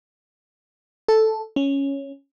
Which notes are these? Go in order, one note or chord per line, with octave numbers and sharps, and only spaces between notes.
A4
C#4